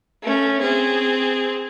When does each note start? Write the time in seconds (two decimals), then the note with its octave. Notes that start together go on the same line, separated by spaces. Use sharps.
0.23 A3 C#4
0.61 C4 G#4